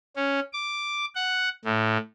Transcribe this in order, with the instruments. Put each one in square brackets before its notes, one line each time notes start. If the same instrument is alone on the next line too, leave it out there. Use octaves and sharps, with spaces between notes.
[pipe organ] C#4
D6
F#5
A2